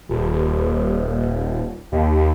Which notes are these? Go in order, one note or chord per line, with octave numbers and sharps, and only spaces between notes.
D#1
D#2